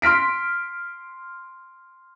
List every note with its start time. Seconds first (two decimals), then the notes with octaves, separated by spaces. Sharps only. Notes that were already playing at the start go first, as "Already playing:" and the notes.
0.02 C6 F6 B6 D7